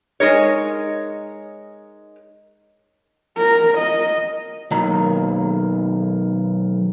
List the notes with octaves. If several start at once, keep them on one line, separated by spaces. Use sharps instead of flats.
G#3 D#4 A#4 C#5
A#4
D#5
B1 D#3 F#3 A#3 D#4 A#5